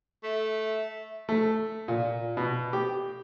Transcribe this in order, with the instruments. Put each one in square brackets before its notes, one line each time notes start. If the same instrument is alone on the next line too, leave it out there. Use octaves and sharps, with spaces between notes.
[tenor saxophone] A3 [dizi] E5
[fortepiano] A3
A#2
B2
G4